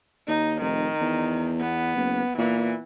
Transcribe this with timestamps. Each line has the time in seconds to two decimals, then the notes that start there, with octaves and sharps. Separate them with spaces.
0.28 D#2 D#4
0.61 F1 D#3
1.01 E2
1.60 B3
1.96 F#1
2.38 A#2 E3